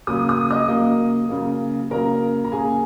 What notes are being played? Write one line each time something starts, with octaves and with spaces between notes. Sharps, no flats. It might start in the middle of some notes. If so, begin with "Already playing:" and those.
C#3 F#3 A#3 D#6
D#6
D#5 D#6
C#3 F#3 A#3
C#3 F#3 A#3
C#3 F#3 A#3 A#4 A#5
A#5
C#3 A#3 G#4 G#5